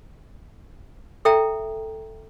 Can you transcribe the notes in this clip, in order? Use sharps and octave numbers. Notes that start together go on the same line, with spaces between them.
A4 E5 G5 A#5